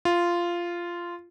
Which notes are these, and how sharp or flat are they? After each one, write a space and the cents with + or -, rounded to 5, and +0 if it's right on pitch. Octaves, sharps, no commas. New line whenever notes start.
F4 -10